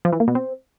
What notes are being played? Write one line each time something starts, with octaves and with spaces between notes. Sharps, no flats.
F3
E3
A#3
B2
C4